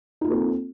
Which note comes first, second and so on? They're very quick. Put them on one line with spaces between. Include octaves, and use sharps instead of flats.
D#4 F4 A#3 A4 C4